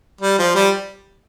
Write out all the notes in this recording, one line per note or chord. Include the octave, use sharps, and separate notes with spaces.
G3
F3
G3